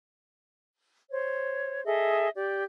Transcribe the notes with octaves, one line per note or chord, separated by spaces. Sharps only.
C5 C#5
G#4 A4 D#5 E5
G4 D5